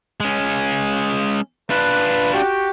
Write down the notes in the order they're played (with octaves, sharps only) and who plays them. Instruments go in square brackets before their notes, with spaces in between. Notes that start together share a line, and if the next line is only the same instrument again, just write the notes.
[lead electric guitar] G#3 C#4
[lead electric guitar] D4 F4 [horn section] B4
[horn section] F#4 G4